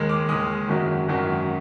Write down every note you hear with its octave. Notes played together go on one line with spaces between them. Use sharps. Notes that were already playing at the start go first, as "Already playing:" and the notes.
Already playing: D#2 D#3 G#3
D6
D#2 D#3 G#3 D#6
G#1 F#2 D#3 F#3
G#1 F#2 D#3 F#3